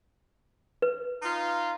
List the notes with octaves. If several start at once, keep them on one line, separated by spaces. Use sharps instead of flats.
B4
D#4 F4